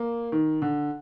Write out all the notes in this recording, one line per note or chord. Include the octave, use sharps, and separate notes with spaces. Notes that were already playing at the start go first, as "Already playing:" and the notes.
Already playing: A#3
D#3
D3